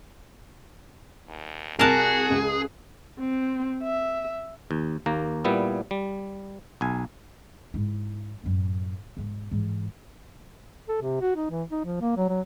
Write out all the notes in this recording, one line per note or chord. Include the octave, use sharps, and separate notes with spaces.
D#2
C2 F#4 G#4 A#4 A5 F#6
C#2
C4
E5
D#2
D#2 A#3 A#5
A#2 G3 B3 E4
G3
B1 G#5
G#2 E4
F#2 A2
E1 G#2
G#2 E3
A4
C3
F#4
D#4
E3
D#4
F3
A#3
F#3
F#3